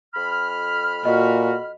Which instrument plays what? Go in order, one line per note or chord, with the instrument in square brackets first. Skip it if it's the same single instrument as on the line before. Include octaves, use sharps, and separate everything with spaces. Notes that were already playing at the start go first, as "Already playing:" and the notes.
[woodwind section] F2 B5 F6
[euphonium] A#2 [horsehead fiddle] F#4 [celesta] D#5